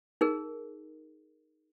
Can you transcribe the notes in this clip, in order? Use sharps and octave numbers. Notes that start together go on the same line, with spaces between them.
D#4 G#4 A#4